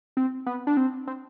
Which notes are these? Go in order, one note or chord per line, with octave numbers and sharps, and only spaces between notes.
C4
B3
D4
C4
C4